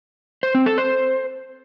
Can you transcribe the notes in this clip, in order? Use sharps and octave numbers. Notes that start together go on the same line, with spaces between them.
C5
C4
A4
C5